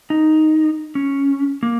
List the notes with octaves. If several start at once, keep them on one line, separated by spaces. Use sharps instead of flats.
D#4
C#4
A#3